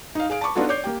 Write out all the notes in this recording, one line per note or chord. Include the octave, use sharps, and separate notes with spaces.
D#4 F5
G#4 F5 D7
A5 B5 C#6 D6
B3 D4 D#4 F4 F#4 A4
C#5 D5 D6 G6 C7
A#3 G4 G5